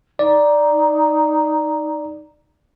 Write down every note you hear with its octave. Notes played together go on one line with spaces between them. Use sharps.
D#4 D5